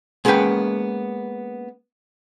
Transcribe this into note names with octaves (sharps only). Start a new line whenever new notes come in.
G#3 A#3 B3 C#4 B4 G5